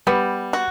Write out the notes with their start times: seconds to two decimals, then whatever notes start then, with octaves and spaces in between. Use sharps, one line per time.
0.07 G3 B3
0.53 F#4